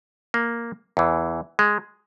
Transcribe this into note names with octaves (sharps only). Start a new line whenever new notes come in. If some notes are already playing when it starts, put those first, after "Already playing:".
A#3
E2 E3
G#3